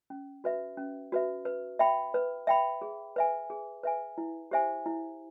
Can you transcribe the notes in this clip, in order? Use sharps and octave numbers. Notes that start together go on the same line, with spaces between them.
C#4
F#4 B4 E5
C#4
F#4 B4 E5
B4
E5 G5 B5
B4
E5 G5 B5
G#4
B4 E5 G#5
G#4
B4 E5 G#5
E4
G4 C5 E5 G#5
E4